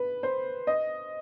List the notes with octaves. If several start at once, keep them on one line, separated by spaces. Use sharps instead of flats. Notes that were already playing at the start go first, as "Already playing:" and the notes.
Already playing: B4
C5
D#5